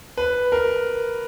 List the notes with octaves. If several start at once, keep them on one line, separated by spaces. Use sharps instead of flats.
B4
A#4